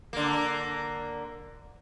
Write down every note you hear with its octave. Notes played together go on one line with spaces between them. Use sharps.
D3 A#3